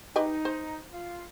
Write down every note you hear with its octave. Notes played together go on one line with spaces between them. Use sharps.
D#4 G4 B4 D#5
C5
F4 F5